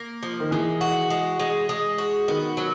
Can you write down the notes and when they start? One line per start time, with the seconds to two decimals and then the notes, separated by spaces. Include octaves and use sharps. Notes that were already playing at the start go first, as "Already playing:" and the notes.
Already playing: A#3
0.23 F3
0.40 D#3
0.51 E3 G#3
0.81 F#4
1.10 G#3
1.40 G#3
1.69 G#3
1.98 F#4
2.28 D#3 B3
2.57 F#3